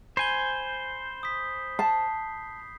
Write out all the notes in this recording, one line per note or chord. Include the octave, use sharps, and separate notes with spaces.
C5 G#5 B5 G6 G7
D#6 B6
A5 C7